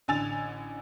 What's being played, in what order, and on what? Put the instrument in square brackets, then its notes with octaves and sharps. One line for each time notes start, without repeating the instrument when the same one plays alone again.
[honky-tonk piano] A1 D3 G#5 E6 A6 F7